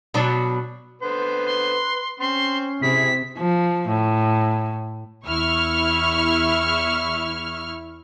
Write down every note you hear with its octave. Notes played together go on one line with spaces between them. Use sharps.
B2 F#3 D4
D3 B3 B4 C5
C6
C4 C#4 C5 C6
C3 E4 G#4 B6
F3
A2
E2 E4 C#6 F6